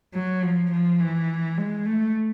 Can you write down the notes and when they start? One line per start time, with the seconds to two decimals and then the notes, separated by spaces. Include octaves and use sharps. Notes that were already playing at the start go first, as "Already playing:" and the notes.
0.14 F#3
0.43 F3
0.71 F3
1.00 E3
1.57 G#3
1.85 A3